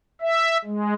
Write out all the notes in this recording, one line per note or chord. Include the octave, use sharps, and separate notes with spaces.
E5
G#3